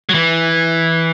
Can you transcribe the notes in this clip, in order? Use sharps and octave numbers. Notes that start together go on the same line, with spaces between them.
F#3
E3